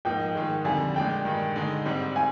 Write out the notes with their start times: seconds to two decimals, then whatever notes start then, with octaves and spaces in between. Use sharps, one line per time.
0.05 G#2 F3 A#3 D#4 G5
0.35 G#2 D#3 G#3
0.64 F2 D3 G3 G#5
0.95 A#2 G#3 D4 G5
1.25 G2 D#3 G#3
1.56 D3 G#3 D#4
1.85 G#2 G3 C4
2.16 G#5